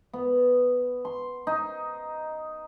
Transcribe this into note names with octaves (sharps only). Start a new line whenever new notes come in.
B3
C6
D#4